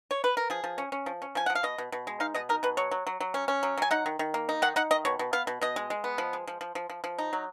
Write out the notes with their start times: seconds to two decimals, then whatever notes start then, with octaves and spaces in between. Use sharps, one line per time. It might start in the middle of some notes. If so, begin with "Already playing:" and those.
0.11 C#5
0.24 B4
0.37 A#4
0.50 F3 G#4
0.64 F3
0.78 C#4
0.92 C#4
1.06 F3
1.22 C#4
1.35 F3 G#5
1.46 F3 F#5
1.55 F5
1.63 B2 D#5
1.78 B2
1.92 B2
2.07 G#3
2.20 D#4 F5
2.34 B2 D#5
2.49 D#4 A#4
2.63 B2 B4
2.77 F#3 C#5
2.91 F#3
3.07 F#3
3.20 F#3
3.34 C#4
3.48 C#4
3.63 F#3
3.77 F#3 G#5
3.91 D#4 F#5
4.06 D#3
4.19 D#3
4.34 A#3
4.49 D#4
4.62 D#3 F#5
4.76 D#4 F#5
4.91 D#3 D#5
5.05 B2 C#5
5.19 B2
5.33 B3 F5
5.47 B2
5.61 B2 D#5
5.76 G#3
5.90 G#3
6.04 B3
6.18 F3
6.33 G#3
6.47 F3
6.61 F3
6.75 F3
6.90 F3
7.04 F3
7.18 D#4
7.33 F#3